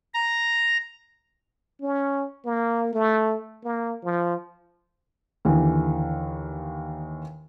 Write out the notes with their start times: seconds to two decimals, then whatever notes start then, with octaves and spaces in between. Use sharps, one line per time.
0.14 A#5
1.80 C#4
2.45 A#3
2.93 A3
3.64 A#3
4.03 F3
5.45 D#2 D3 E3